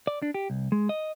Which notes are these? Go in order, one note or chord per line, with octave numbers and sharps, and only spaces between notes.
D5
D4
G4
C2
G#3
D#5